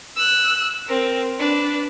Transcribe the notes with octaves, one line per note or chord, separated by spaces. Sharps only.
E6 F#6
C4 A#4
D4 B4